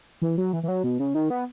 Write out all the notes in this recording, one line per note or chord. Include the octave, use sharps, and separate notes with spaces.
E3
F#3
E3
E3
F#3
B2
C#3
D#3
B3